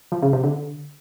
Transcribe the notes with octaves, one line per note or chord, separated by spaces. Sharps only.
F3
C#3
C3
D3